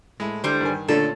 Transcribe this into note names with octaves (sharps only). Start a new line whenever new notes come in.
A2 G#3 E4
D3 G3 C5
G2 D#3 G#5
A#2 D3 A3 C#4 A4